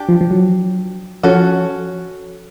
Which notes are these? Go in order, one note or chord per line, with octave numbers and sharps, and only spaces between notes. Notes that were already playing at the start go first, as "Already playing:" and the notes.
Already playing: D4 G4
F3
F3
F#3
F3 C#4 F#4 A4